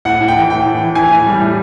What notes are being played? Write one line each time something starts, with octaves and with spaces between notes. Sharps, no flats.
A2 F#5
A2
G5
E3
A2 G5
A2
E3
E3 G#5
A2
G3
A2